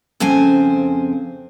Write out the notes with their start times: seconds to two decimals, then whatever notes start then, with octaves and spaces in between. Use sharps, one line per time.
0.20 F2 C#3 C4 C5 G#5